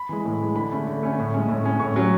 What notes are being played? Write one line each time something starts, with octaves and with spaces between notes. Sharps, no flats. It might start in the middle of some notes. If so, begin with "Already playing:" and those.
Already playing: B5
E3 G#3
A2
E3 G#3
D3 B5
A3 C#4
D3
A3 C#4
A2
G#3 C#4
A2
G#3 C#4
A2 C#6
F#3 C#4